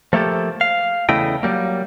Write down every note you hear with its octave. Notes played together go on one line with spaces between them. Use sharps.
F3 A3 A#3 G4 A4
F5
E2 C#3 A3 E4 D#5 G5
F#3 G3 A#3